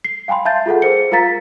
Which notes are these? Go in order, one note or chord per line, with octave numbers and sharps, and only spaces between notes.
C7
F5 G5 G#5 B5 C6
E5 F5 A5 G6 A6
F4 G#4 A4 F#5
G#4 A#4 C5 C#7
F4 A#4 F5 A#5 A6 B6